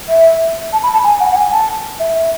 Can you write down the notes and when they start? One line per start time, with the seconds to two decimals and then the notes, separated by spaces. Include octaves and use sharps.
0.09 E5
0.73 A5
0.83 B5
0.93 A5
1.04 G#5
1.20 F#5
1.32 F#5
1.36 G#5
1.52 A5
2.00 E5
2.15 E5